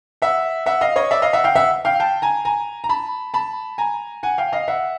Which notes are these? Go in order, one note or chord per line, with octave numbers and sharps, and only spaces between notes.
E5 F#5
E5 F#5
D#5 F5
C#5 D#5
D5 E5
D#5 F5
E5 F#5
F5 G5
E5 F#5
F5 G5
G5 A5
G#5 A#5
G#5 A#5
A#5
A5 B5
A5 B5
G#5 A#5
F#5 G#5
F5 G5
D#5 F5
E5 F#5